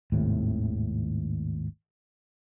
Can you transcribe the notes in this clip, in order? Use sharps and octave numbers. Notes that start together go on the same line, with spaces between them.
G#1 D#2 A2 C3